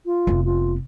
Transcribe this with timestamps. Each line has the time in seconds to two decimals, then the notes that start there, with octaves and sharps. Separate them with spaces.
0.05 F4
0.27 F1 B3
0.44 F4